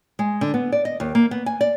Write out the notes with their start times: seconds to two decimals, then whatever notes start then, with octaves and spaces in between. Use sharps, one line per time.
0.19 G#3
0.41 D3
0.54 B3
0.72 D5
0.85 D#5
1.00 D#2
1.15 A#3
1.31 B3
1.46 G#5
1.61 D5